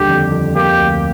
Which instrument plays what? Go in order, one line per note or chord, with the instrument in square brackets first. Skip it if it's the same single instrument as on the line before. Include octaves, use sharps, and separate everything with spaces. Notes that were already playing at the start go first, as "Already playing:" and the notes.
Already playing: [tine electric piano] D#2 D3 G3 [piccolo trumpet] G4
[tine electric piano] F2
F2
[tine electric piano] A#3 [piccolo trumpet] G4
[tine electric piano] D2